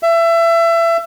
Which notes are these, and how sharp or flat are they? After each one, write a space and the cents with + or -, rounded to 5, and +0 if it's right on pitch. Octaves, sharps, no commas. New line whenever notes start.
E5 +25